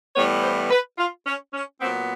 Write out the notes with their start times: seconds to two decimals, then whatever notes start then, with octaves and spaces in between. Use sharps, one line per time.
0.15 A2 E3 G3 B3 C#5
0.43 C5
0.71 B4
0.98 F4
1.26 C#4
1.54 C#4
1.81 A#2 F#3 B3 C4